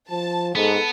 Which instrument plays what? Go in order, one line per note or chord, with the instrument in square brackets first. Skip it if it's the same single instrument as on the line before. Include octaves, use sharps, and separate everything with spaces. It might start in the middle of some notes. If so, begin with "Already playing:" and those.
[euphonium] F3 [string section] A5
[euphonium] G#2 [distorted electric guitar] B3 [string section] A4